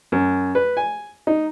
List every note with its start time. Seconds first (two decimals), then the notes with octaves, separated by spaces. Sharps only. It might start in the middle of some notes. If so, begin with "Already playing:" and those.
0.12 F#2
0.55 B4
0.77 G#5
1.27 D#4